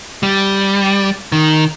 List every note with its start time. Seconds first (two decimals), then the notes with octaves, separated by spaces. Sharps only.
0.23 G3
1.32 D#3